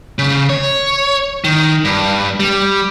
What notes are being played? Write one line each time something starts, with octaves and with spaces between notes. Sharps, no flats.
C#3
C#5
D#3
G2
G3